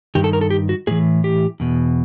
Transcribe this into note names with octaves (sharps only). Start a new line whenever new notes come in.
G2 D#3 G4
A4
A#4
A4
G4
F#4
A2 E3 G#4
G4
E2 B2